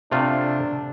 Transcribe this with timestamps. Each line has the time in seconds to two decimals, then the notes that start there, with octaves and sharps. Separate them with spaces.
0.12 C3 A3 D4 F4